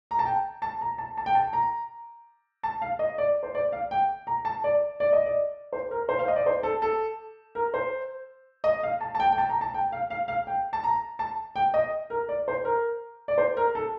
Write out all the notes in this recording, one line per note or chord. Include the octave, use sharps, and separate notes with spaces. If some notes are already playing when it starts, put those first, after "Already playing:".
A#5
A5
G5
A5
A#5
A5
A5
G5
A5
A#5
A5
F5
D#5
D5
C5
D5
F5
G5
A#5
A5
D5
D5
D#5
D5
C5
A#4
C5
F5
D#5
D5
C5
A4
A4
A#4
C5
D#5
F5
A5
A5
G5
G5
A5
A#5
A5
G5
F5
F5
F5
G5
A5
A#5
A5
G5
D#5
A#4
D5
C5
A#4
D5
C5
A#4
A4